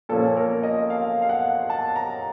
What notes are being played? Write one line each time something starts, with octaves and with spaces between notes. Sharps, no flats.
A#2 F3 A#3 C#4 A4
A#4
D#5
F5
F5
F#5
A5
A#5